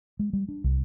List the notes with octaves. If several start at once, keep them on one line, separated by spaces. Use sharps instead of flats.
G#3
G3
D4
C2